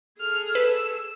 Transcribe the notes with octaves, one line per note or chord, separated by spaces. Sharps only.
G#4 A4 F6
B4 E6